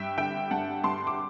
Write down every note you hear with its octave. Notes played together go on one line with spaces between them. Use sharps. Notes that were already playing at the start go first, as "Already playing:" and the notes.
Already playing: G2 E5 G5
D3 E5 G5
G2 F#5 A5
G2 A5 C6
D6